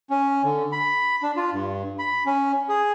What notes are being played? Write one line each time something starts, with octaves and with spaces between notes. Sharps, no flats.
C#4
D3
B5
D4
F4
G2
B5
C#4
G#4